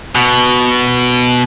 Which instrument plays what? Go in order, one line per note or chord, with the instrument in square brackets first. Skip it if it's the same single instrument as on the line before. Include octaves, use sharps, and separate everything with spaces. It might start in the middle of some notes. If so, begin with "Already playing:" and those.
[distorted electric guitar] B2